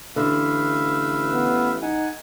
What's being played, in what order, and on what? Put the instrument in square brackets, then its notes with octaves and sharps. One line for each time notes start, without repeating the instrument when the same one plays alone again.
[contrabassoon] A1 [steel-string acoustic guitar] D3 [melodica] B4 E5 F5
[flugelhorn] B3
[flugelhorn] D#4 [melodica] F#5 G#5